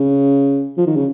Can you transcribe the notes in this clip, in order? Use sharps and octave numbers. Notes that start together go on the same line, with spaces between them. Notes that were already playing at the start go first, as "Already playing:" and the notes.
Already playing: C#3
F3
D#3
C#3